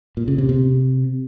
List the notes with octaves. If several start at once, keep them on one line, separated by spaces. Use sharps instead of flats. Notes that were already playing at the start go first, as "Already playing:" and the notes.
A#2
C#3
C3
C3